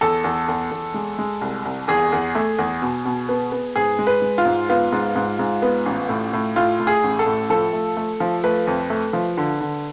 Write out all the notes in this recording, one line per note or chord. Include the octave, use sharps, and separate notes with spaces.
E2 A4
E2
E2
E2
G#3
G#3
C2
C2
E2 G#4
E2
A3
E2
B2
B2
B3
B3
G#2 G#4
G#3
B4
G#3
F4
G#2
B3 F4
G#2
G#2
G#2
B3
A1
A2
A2
A2 F4
A2
G#4
A1
A4
A2
F3 A4
A3
A3
F3
A3 B4
F2
A3
F3
D3
D3